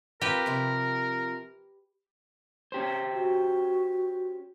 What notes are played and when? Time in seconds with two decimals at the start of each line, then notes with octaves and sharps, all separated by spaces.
0.21 C4 F4 G4 A#4 B4
0.46 C3 F3
2.72 C#4 G4 C5
3.13 F#4